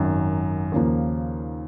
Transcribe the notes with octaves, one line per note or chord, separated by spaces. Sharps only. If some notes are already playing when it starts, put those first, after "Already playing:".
Already playing: G#1 F#2 D#3
D#2 C#3 F3 A#3